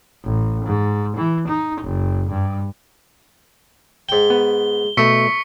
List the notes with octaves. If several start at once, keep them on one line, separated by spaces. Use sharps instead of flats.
A1
G#2
E3
D#4
F#1
G2
G#2 G5 G7
B3
B2 A3 E5 C#6 B6 C#7